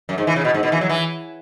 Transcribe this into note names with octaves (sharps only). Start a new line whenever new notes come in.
F#2
G#2
E3
C#3
B2
G#2
B2
E3
F#3
E3